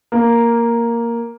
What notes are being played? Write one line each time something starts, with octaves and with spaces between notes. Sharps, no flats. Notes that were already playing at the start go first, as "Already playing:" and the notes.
A#3